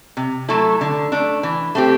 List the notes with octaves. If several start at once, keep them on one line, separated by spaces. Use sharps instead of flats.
C3
F#3 A3 E4 A4
D3
A3 D4
E3
A3 C4 G4